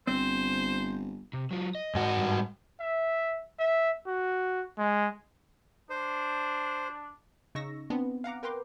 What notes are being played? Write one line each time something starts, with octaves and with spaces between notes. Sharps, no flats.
G1 C4 C5
C3
F#3 F4
D#5
G#2 F#4
G2
E5
E5
F#4
G#3
D4 C5
C#3 D#4 C#6 E6 A#6
B3 C4 D4
F5 F#5 A#5 D6
A#4 B4 G5 A#5 C6 D6